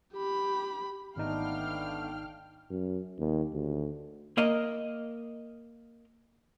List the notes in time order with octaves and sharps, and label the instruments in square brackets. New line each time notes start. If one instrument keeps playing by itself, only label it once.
[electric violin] G4 B5
[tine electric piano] G#1 D#4 [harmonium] A3 B3 D4 [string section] F5 G5 F6
[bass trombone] F#2
D#2
D2
[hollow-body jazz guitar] A#3 A#4 D#5